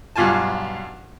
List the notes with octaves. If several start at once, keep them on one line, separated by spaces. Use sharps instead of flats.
B1 G2 F4 G#5 A5